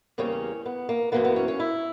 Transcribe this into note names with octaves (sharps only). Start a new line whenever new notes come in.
E2 C#3 G3 A#3 C#4
B3
A#3
F#2 E3 A#3 B3
B3
C#4
C#4
E4